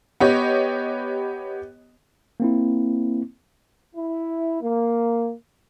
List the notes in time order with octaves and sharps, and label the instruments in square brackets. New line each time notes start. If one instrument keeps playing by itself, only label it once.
[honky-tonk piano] B3 G4 C#5 D#5
[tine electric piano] A#3 C4 E4
[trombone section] E4
A#3